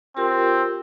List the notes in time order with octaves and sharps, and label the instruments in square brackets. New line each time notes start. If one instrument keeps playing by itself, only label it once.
[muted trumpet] C4 [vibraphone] F4 G4 A#4